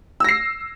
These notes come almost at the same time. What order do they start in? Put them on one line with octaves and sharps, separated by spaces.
E6 A#6 C7